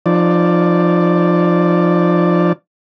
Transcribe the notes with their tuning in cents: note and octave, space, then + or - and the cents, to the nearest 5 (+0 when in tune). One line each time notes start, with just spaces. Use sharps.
F3 +0 D#4 -35 D5 +0